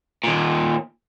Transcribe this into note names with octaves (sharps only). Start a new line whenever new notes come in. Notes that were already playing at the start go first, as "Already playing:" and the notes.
D#2 A#2